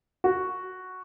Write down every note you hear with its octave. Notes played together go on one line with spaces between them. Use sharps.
F#4